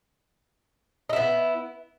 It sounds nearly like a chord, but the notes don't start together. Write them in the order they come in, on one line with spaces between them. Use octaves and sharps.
D#4 E4 B3